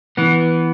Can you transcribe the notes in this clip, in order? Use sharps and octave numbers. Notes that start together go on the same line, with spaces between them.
E3 B3